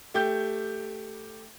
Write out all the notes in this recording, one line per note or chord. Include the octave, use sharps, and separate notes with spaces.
A3 G4 G6